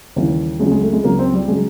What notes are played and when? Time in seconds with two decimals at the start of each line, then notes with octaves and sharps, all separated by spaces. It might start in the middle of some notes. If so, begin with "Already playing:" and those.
0.16 D#2 C#3 E3 G3
0.59 C#2 C#3 F#3 G#3
0.71 G#3
0.83 A3
0.93 G#3
1.04 C#2 C#3 F#3 A#3
1.19 C4
1.34 G3
1.48 C#3 F#3 G#3